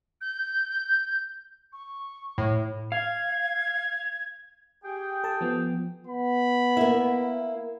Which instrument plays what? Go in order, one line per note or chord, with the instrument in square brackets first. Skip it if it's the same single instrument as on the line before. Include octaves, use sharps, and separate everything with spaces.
[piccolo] G6
C#6
[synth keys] A2
[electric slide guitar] F5 [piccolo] G#6
[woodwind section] G4 G#4 G5
[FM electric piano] A4 A5
F3 B3
[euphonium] B3 [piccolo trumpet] B5
[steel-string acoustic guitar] A#3 E4